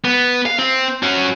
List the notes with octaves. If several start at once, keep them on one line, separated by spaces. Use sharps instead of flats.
B3
F5
C4
C#4 F#4